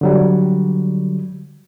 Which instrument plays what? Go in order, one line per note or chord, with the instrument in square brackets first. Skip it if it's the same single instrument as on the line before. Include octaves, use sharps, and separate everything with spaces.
[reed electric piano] D3 F#3 G3